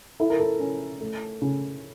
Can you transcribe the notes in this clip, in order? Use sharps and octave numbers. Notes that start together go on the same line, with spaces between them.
E4 A4
A#4
A4
C#4
A3
C#3